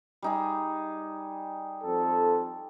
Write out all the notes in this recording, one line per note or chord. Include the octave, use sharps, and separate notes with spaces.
G3 D#4 G#4
F2 A4